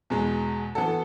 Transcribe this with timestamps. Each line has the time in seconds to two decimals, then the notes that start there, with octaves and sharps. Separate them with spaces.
0.10 E2 B2 G#3
0.75 E3 B3 F#4 A4